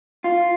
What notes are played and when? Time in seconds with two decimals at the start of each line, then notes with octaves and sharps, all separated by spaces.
0.24 F4